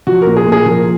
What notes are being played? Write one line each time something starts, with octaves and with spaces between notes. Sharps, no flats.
F3 F#4
A#4
A#2
G#4
A#2
G#4
F3 A#4